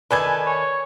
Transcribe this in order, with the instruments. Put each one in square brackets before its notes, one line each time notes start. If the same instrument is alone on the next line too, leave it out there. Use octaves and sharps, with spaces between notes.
[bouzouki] D#3 A4 D5 [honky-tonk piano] B4 G#5 G#6
[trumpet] C#5